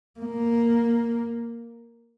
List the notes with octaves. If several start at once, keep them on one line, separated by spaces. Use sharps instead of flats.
A#3